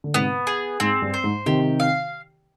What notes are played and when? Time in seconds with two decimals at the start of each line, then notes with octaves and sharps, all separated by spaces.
0.04 D3
0.14 G#2 C3 B3
0.47 G#4
0.80 G#2 C4
1.02 G2
1.14 C5
1.24 G#2
1.46 C3 D#3 G4
1.80 F5